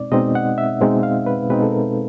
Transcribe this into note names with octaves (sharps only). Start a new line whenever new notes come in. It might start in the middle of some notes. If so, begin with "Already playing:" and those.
Already playing: B2 G#3 C4 D#4 D5
B2 G#3 C4 D#4 D#5
F#5
E5
B2 G#3 C4 D#4
F5
B4
B2 G#3 C4 D#4 B4
A4
A#4